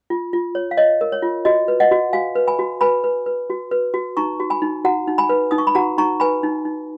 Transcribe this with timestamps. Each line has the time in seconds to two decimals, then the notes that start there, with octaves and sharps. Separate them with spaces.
0.10 F4
0.33 F4
0.55 C#5
0.71 F5
0.77 C#5 D#5
1.01 A#4
1.12 C#5
1.22 F4
1.45 F#4 D#5
1.68 B4
1.80 D#5 F#5
1.91 F#4
2.13 F#4 F5 G#5
2.35 B4
2.47 G#5 B5
2.59 F#4
2.81 B4 G#5 B5
3.04 B4
3.26 B4
3.50 F#4
3.71 B4
3.94 F#4
4.17 D#4 A#5 C#6
4.40 F#4
4.50 G#5 B5
4.62 D#4
4.85 F#4 F#5 A#5
5.08 D#4
5.18 G#5 B5
5.29 B4
5.51 D#4 D#6
5.58 C#6
5.67 B5
5.75 F#4 F#5 A#5
5.98 D#4 A#5 C#6
6.20 B4 G#5 B5
6.43 D#4
6.65 D#4